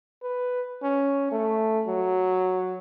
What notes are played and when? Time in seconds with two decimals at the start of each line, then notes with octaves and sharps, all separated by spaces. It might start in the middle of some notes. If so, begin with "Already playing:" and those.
0.22 B4
0.82 C#4
1.32 A3
1.87 F#3